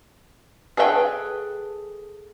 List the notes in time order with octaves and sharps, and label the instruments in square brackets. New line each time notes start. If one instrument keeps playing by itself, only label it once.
[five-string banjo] G#4 A4 B4 E5 G5